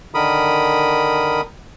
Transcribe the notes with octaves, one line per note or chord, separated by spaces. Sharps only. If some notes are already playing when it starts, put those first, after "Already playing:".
D3 D#3 A#4 B5 D#6